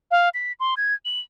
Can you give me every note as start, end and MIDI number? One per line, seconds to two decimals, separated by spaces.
0.11 0.29 77
0.34 0.52 95
0.60 0.74 84
0.77 0.94 92
1.05 1.20 102